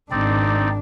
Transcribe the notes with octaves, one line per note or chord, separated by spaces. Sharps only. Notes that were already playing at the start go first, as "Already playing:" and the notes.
G#1 C4 D4 D#4 D5